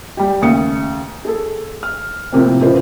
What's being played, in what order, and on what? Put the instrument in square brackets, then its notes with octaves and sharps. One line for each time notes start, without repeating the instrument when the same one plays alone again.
[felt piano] G3 G4
D#2 C#3 A3 D#6 C#7
G#4 A4
F6
A2 C3 F3 A#3 C4
C#3 E3 F3 B3 B4 C5